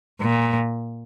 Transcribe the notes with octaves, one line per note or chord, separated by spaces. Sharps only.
A#2